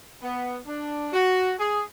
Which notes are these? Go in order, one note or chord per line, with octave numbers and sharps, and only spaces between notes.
B3
D4
F#4
G#4